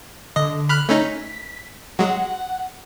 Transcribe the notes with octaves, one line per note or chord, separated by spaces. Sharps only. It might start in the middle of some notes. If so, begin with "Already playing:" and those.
D3 D#5
B5 F6 F#6
A3 C#4 D#4 B6
F#3 G#3 F#5